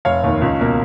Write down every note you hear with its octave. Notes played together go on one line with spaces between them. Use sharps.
F1 C#5 F5
D#2 D#3
C#2
B2 A#3